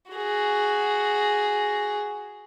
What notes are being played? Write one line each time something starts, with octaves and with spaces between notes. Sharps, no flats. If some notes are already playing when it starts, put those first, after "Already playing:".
F#4 G#4